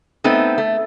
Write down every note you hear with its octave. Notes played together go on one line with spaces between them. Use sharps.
A3 B3 C4 D#4
A3